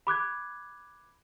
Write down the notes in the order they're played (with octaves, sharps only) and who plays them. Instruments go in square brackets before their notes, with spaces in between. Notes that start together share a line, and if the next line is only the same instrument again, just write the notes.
[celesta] B5 D6 F#6 G#6